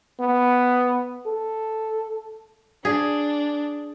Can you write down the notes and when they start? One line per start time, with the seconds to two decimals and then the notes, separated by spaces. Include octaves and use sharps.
0.20 B3
1.27 A4
2.85 D4 G#4